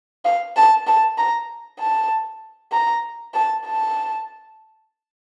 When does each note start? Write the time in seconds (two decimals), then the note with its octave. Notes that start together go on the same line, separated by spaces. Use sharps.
0.25 F5
0.56 A5
0.87 A5
1.18 A#5
1.79 A5
2.72 A#5
3.34 A5
3.66 A5